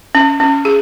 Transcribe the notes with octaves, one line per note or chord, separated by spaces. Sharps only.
C#4
C#4
G#4